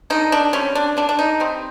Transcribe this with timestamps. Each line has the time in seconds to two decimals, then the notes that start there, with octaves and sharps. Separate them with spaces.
0.10 D3 D#4
0.32 D4
0.53 G3 C4 C#4
0.75 D4
0.97 D3 D4
1.09 D4
1.19 D#4
1.40 G3 C4